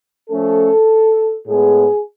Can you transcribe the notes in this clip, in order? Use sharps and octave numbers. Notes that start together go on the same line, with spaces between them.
F3 A3 C#4 A4
A2 G#3 B3 G#4